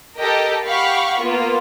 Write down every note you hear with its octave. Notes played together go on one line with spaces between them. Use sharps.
G4 A4 A#4 D#5 G5
G4 F5 F#5 B5 C#6
A#3 B3 F4